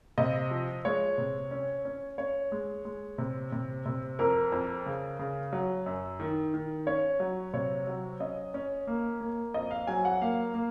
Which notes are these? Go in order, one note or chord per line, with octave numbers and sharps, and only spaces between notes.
C3 D#5
F3
G#3 C#5
C3
C#4
C#4
C#4 C#5
G#3
G#3
C3
C3
C3
F2 A#4
F2
C#3
C#3
F#3
F#2
D#3
D#3
C#4 C#5
F#3
C3 C#5
F#3
C#4 D#5
C#4
A#3
A#3
F2 D#5
F5
F#3 G#5
F#5
A#3 F5
A#3